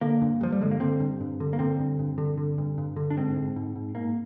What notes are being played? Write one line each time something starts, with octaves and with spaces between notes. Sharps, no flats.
D3 A#3
G2
G2 F3
G3
D3 G#3
A#3
D3 C4
G2
G2
D3
A#3
D3 C4
G2
G2
D3
D3
G2
G2
D3
D4
G#2 C4
G#2
G#2
G#2
G#2 A#3